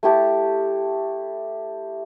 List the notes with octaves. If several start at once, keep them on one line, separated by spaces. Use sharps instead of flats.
A3 E4 G4 A4